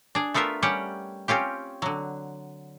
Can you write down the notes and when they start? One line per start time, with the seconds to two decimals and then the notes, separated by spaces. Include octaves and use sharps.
0.15 D4 G#4
0.34 A3 B3 F4 A#4 E5
0.62 G3 C#4 G4 F#5
1.28 C4 C#4 F4 G4
1.82 D3 F#3